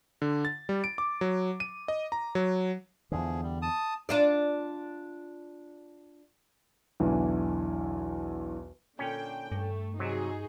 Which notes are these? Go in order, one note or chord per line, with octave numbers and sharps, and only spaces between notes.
D3
A6
G3
D7
D6
F#3
D#7
D#5
A#5
F#3
E2 D3 F3 G#4
G3
A5 D#6
D4 F4 D5
B1 E2 D3 E3
A#2 D3 C#4 G5
G2 A3
C3 F#3 D#4 F#4 G#4